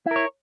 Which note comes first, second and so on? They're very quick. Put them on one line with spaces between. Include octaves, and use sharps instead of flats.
E4 A#4 C#5